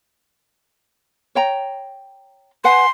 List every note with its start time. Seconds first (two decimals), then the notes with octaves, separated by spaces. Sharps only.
1.35 C#5 G5 A#5
2.64 B4 F#5 G#5 C6